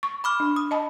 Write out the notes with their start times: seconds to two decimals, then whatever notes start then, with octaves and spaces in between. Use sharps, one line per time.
0.03 C#6
0.24 B5 D6 F6
0.40 D4
0.56 D#6
0.71 D#5 A5 B5